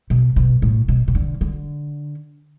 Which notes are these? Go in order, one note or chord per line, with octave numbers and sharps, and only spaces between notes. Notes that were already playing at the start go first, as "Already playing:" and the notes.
B2
B2
A2
B2
C3
D3
D3